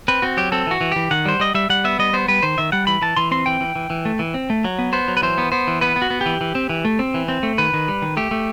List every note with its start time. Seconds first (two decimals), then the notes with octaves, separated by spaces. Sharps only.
0.08 C4 B4
0.22 C4 F#4
0.37 F#3 G4
0.52 C4 A4
0.67 E3 F#4
0.81 E3
0.92 E3 G4
1.11 D#3 F#5
1.25 G3 C5
1.40 G3 D#5
1.54 G3 E5
1.70 G3 F#5
1.84 B3 E5
1.99 G3 D#5
2.13 B3 C5
2.28 G3 B4
2.43 D#3 C5
2.58 D#3 E5
2.72 G3 F#5
2.87 E3 B5
3.02 E3 A5
3.17 E3 C6
3.31 C4 C6
3.46 E3 G5
3.61 E3
3.76 E3
3.90 E3
4.05 A3
4.19 E3
4.34 C4
4.50 A3
4.65 F#3
4.79 B3
4.93 B3 C5
5.08 F#3
5.17 B4
5.22 E3 C5
5.38 B3
5.52 B3 C5
5.68 E3
5.81 B3 B4
5.96 B3
6.02 F#4
6.10 B3
6.21 E3 G4
6.41 E3
6.55 C4
6.69 E3
6.85 A3
6.99 C4
7.14 E3
7.28 C4
7.43 A3
7.58 D#3 B4
7.74 D#3
7.88 G3
8.02 D#3
8.17 A3 G4
8.31 A3